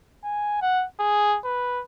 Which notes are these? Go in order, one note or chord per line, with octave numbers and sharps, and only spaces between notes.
G#5
F#5
G#4
B4